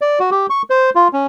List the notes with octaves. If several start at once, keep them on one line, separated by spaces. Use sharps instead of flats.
D5
F#4
G4
C#6
C5
F4
C#4